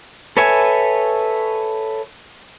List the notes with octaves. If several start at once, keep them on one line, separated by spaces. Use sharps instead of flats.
A4 B4 C#5 E5 G#5